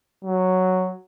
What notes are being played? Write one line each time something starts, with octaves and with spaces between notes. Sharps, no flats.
F#3